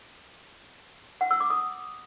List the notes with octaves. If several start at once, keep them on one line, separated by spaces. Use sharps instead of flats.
F#5
E6
D6
D#6